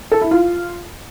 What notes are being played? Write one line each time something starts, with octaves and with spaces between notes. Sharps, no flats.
A4
E4
F4